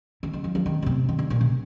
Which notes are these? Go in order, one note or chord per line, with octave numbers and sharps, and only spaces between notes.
D3
D#3
F3
F3
D#3
D3
C3
D#3
D3
A#2
C3